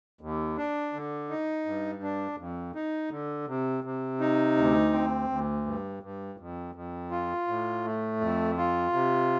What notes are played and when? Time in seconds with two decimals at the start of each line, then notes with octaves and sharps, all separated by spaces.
0.21 D#2
0.57 D4
0.93 D3
1.30 D#4
1.66 G2
2.03 D4
2.38 F2
2.75 D#4
3.11 D3
3.48 C3
3.84 C3
4.20 D#4
4.57 D2
4.93 C4
5.30 D2
5.66 G2
6.03 G2
6.39 F2
6.75 F2
7.11 F4
7.48 A2
7.84 A3
8.21 F2
8.57 F4
8.93 C3